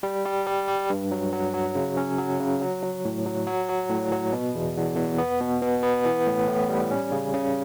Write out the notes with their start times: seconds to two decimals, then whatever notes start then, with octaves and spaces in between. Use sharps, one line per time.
0.03 G3
0.26 G3
0.47 G3
0.68 G3
0.90 G2
1.11 F#3
1.32 F#3
1.54 F#3
1.75 C#3
1.97 C#4
2.18 F#3
2.40 C#3
2.61 F#3
2.83 F#3
3.05 A2
3.26 F#3
3.47 F#3
3.69 F#3
3.90 A2
4.12 F#3
4.32 B2
4.55 E2
4.77 E2
4.97 E2
5.18 B3
5.40 B2
5.62 B2
5.83 B3
6.05 E3
6.27 A2
6.48 A2
6.69 G3
6.91 C#4
7.12 C#3
7.33 C#3